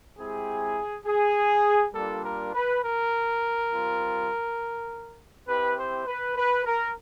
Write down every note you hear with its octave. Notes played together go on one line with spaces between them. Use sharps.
G#3 C4 E4 G4 G#4
G#4
G3 A#3 D4 F4 A4
A#4
B4
A#4
G3 C4 F4
C4 E4 G4 B4
C5
B4
B4
A#4